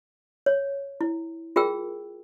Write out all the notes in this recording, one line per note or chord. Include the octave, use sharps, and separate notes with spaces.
C#5
E4
F4 G#4 A#4 G5 E6